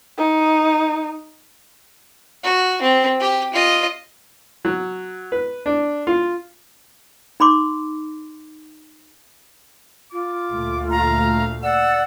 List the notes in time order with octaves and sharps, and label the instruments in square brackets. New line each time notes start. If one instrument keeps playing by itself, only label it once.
[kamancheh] D#4
[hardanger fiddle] F#4
C4
G4
F4 D#5
[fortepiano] F#3
B4
D4
F4
[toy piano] D#4 B5 C6 D6
[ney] F4 [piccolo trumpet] D6
[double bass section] D2 A#2 A3
[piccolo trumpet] F5 [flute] A#5
[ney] D5 [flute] F#5 [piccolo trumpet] E6